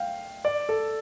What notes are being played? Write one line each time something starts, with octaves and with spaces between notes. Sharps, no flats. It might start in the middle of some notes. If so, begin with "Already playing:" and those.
Already playing: F5 G5
D5
A4